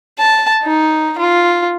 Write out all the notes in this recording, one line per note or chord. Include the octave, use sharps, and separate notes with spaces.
A5
D#4
F4